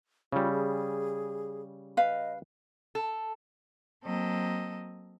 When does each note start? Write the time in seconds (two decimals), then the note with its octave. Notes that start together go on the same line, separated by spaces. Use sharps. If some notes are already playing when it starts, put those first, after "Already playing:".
0.32 C#3 G3 F4
0.51 G#4
1.97 B4 D#5 F5
2.95 A4
4.04 F#3 A#3 C4 A4 D#5